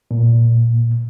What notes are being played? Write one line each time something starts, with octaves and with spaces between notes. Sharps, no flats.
A#2